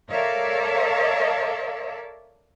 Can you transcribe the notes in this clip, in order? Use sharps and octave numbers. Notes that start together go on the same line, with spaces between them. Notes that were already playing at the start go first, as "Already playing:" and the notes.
A4 A#4 C#5 D5 E5 F5